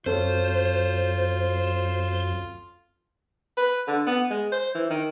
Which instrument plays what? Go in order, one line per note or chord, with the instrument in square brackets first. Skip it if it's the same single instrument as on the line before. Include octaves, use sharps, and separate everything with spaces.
[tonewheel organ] F#2 [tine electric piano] C4 A4 C#5 [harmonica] F4 [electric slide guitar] C5
[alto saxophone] B4
D3
B3
G#3
C5
E3
D#3